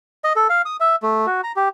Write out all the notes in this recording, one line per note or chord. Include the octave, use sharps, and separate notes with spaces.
D#5
A4
F5
D#6
E5
A3
F#4
A#5
G4